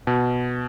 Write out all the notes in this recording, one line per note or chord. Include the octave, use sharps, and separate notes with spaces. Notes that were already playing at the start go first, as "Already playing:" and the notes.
B2